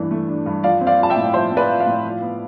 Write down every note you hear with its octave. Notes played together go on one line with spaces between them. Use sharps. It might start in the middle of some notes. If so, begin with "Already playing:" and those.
Already playing: G2 E3 A3 D4
A3
D4
G2
F3 D5 F5
C4
D5 F5
F4 A5
E5 G5
A2
F3 C5 E5
C4
B4 D5
F4
D5 F5
A2
F3
B3